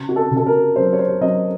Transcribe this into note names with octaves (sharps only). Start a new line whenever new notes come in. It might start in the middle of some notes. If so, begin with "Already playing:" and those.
Already playing: C#3
F#4
A4
C#3
A4
A#4
F#3 C5
C#5
C5
F#3 D#5